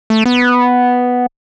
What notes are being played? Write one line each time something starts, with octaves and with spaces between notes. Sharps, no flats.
A3
B3